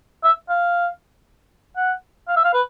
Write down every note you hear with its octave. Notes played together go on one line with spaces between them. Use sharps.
E5
F5
F#5
F5
E5
F5
B4